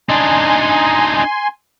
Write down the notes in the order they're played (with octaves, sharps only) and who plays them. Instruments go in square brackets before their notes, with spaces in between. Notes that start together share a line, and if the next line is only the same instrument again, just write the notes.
[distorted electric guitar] D4 D#4 [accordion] G#5 C6